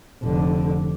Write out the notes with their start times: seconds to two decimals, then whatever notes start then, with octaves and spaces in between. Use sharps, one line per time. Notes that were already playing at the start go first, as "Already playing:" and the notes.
0.23 F1 D3